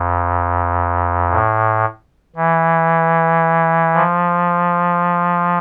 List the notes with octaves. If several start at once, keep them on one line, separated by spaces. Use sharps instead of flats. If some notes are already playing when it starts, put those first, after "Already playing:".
Already playing: F2
A2
E3
F3